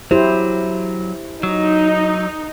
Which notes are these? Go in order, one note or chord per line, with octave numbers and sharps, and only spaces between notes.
F#3 E4 G4 C5
F#3 D#4